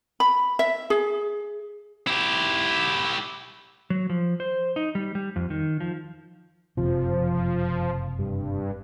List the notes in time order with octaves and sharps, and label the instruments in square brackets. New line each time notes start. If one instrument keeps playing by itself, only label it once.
[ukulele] B5
E5
G#4
[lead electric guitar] E4 G4
[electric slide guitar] F#3
F3
C5
D#4
G3
G3
F2
D#3
F3
[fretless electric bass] F#1 F2 C3 [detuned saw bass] F3
[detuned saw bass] G2